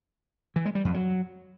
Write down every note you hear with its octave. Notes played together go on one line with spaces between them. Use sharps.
E3
G#3
G3
F2
F#3